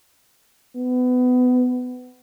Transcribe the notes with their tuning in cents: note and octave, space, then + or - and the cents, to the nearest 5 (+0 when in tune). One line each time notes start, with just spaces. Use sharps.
B3 +25